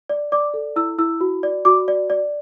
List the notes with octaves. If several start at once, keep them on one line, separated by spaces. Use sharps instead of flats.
D5
D5 D6
A4
E4 E6
E4 E6
F#4
D5
F#4 D6
D5
D5